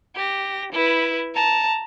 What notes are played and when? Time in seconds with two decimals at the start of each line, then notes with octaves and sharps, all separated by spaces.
0.15 G4 A#6
0.73 E4 B4
1.35 A5 A#5